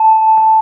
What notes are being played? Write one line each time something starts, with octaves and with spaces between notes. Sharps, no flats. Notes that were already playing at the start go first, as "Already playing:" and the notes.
Already playing: A5
A5